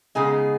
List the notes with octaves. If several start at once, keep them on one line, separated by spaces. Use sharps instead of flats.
C#3 G#3 B3 D#4 G#4